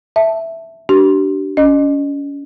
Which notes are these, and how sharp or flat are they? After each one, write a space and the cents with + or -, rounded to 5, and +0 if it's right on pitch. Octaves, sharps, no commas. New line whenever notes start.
E5 +0 A5 +0
D4 +0 G4 -40
C#4 +30 D#5 -25